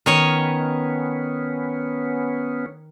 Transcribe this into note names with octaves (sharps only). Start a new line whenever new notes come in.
D#3 B3 C#4 C#5 D#5